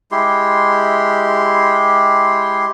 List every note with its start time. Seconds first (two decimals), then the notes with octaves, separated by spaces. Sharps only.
0.12 G#3 E4 G4 C6